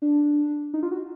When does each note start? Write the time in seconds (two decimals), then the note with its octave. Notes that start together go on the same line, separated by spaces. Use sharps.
0.02 D4
0.74 D#4
0.83 F4
0.91 F#4